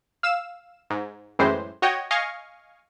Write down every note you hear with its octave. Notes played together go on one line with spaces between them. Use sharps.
F5 E6 E7
G#2
F#2 A2 E3 G#3 C5
F#4 C#5 D#5 G5
D#5 F5 G#5 C#6